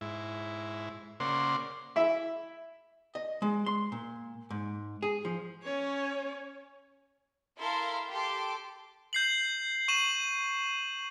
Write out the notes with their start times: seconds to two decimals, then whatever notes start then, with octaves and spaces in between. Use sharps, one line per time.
0.01 G#2 E4
1.20 C#3 A#3 C5 D5 F#5 C6
1.96 E4 E5
3.15 D#5
3.42 G#3
3.66 C6
3.92 A#2
4.50 G#2
5.02 G#4
5.25 F3
5.63 C#4 C#5
7.60 E4 A4 A#4 F5 A#5 C6
8.10 G4 A4 C6 D6
9.13 G6 C7 F#7
9.88 C#6 D#7 E7 F#7